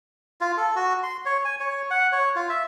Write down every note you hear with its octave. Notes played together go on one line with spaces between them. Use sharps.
F4
A4
F#4
C6
C#5
G#5
C#5
F#5
C#5
F4
E5